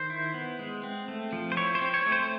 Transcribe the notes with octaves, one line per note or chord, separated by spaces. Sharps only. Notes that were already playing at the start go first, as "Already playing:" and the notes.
Already playing: D#3 C5
E4
B3
G#3
C4
A3
F3
C5
E4 C#5
C5
C4
C#5
A3
C5